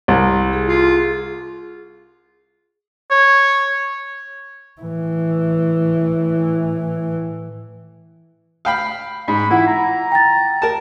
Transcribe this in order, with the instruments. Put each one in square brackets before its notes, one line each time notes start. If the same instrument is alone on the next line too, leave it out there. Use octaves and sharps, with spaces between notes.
[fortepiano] C2
[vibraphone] G#4
[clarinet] F4 [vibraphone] G#4
[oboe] C#5
[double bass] A2 E3
[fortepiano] F5 G5 B5
[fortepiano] G#2 [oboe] B5
[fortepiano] E3 [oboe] E4 [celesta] F4 F#5
[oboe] A#5
[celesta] G5 A6
[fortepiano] A#4 A5